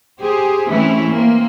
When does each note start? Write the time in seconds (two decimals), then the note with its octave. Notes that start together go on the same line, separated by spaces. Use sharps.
0.21 G4 G#4 C5
0.68 E3 A3 C4 C#4 E4
1.11 A#3 C4